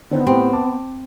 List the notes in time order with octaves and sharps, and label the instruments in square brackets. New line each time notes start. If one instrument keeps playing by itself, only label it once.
[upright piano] D3 C4 D#4 [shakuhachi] B3
[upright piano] A2 G4 [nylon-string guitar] C4
[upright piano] A5 D6